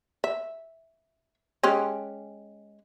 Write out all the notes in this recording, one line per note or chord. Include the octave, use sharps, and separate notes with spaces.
E5
G#3 C#4 G4